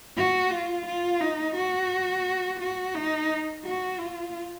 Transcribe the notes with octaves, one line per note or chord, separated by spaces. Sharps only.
F#4
F4
F4
D#4
F#4
F#4
D#4
F#4
F4